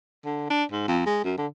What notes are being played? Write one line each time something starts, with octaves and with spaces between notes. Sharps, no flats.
D3
D4
G#2
F2
G#3
F#2
D3